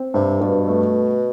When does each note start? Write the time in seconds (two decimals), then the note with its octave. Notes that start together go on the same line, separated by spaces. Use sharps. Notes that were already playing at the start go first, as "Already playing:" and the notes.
Already playing: C4
0.14 G2 C3
0.41 G2 B2
0.68 A3